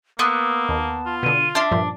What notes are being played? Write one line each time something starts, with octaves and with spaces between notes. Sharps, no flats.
A#3 B3 C6 D6 E6 F#6
D#2 A5
F4
B2 D3 D#7
D4 E5 A5 C6 F6
G2 A#2 F3